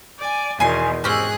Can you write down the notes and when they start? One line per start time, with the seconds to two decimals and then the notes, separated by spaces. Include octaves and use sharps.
0.19 D5 G#5
0.60 E2 B2 D#3 G#5 C6
1.04 G#2 C4 C#4 G4 G#4 F#6